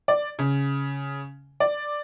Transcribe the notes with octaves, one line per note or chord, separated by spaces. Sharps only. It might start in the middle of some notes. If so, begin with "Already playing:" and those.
D5
C#3
D5